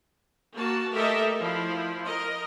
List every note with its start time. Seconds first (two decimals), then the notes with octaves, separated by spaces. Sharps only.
0.54 A#3 F#4 A5
0.92 A3 G4 A4 A#4 D#5 E5
1.40 F3 E4
2.04 A#4 D#5